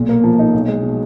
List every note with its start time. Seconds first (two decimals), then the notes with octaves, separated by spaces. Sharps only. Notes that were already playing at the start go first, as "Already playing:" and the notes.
Already playing: B1 A#2
0.09 A#3
0.24 F3
0.39 D#4
0.54 B1
0.68 G#3
0.83 B2